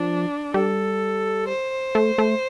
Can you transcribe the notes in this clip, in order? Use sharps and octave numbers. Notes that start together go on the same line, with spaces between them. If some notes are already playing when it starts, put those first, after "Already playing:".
Already playing: F3 D4
G3 A4
C5
A3
A3